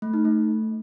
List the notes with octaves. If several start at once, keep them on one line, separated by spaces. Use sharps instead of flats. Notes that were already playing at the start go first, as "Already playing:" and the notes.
A3
D#4
A3